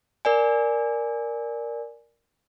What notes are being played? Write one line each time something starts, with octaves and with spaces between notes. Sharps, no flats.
A#4 D5 G#5